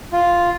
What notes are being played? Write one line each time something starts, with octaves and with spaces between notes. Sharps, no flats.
F4